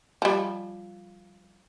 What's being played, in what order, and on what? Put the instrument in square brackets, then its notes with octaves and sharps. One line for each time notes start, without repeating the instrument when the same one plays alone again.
[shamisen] F3 G3